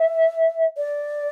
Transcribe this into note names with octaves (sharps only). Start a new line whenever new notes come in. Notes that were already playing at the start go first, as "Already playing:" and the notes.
Already playing: E5
D5